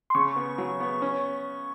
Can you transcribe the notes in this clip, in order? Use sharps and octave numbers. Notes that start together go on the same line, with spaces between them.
C6
C#3 C#6
B3
F#3
B3
C#4